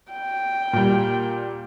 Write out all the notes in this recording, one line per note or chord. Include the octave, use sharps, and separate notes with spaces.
G5
A#2 G3